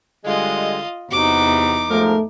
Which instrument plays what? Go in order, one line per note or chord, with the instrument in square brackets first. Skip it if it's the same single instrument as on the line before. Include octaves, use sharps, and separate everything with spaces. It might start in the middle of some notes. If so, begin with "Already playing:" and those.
[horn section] D3 G3 G#3 [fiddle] F4 D#5
[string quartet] E2 D#4 [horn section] C3 F#4 [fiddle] D6
[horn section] G#2 F3 A#4 [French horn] A3